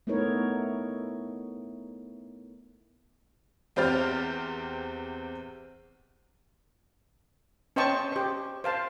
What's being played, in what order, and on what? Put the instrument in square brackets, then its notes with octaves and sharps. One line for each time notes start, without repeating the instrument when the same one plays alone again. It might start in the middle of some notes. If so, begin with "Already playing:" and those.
[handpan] A3 B3 D#4 E4 A#4 C#5
[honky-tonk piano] E2 C4 G4 C5 F6 A6
[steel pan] C#4 C5 D#5 G5 A5 C#6
G4 C5
C5 F5 A5